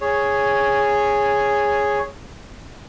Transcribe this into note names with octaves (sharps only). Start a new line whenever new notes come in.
G#4 C#5